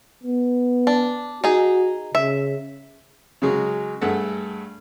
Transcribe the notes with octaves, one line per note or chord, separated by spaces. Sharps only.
B3
D4
D#4 F#4 G#4
C#3 E5
C#3 F#3 G#3
G2 A3 G#4 A4 F#5